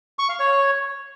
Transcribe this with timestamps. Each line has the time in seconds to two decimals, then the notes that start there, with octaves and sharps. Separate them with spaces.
0.19 C#6
0.29 F5
0.40 C#5